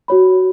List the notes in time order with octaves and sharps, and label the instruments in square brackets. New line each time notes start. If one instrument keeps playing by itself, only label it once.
[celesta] F#4 C#5 B5